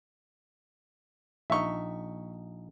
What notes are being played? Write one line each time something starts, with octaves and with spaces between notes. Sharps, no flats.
A#1 D#4 E5 C#6